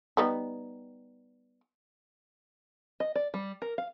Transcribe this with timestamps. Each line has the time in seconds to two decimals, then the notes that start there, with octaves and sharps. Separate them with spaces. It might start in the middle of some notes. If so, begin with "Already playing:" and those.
0.17 G3 B3 D#4
3.00 D#5
3.15 D5
3.34 G3
3.62 A#4
3.78 F5